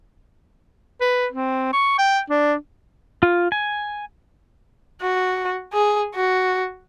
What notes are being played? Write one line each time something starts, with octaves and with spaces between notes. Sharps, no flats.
B4
C4
C#6
G5
D4
F4
G#5
F#4
G#4
F#4